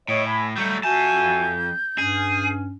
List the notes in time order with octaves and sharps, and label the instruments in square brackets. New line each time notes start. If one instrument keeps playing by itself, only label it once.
[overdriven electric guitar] A2 [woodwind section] C#5 D#5
[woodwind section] G#5 B5
[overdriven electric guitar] F#3 A3 [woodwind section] G3 [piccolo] G6
[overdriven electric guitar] F2 A5 [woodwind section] F#4 E5 G#5 [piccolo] G6
[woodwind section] G2 C#4 [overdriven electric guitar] G#4